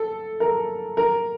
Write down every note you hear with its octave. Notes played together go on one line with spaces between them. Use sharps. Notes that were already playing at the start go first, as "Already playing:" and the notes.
Already playing: A4
A#4
A#4